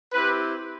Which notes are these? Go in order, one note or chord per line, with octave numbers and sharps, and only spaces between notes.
C4 E4 G4 B4